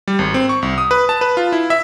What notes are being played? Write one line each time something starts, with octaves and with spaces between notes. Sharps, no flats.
G3
G#1
C4
C#6
C2
D#6
B4
A5
B4
F4
E4
E5